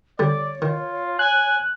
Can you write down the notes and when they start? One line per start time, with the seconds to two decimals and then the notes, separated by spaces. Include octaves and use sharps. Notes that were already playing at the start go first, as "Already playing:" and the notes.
0.19 D3 G3 C#5 D5
0.62 D#3 F4
1.19 G#5 F#6